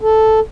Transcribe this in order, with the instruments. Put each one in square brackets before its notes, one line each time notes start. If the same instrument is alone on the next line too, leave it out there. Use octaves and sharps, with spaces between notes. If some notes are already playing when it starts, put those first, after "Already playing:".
[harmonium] A4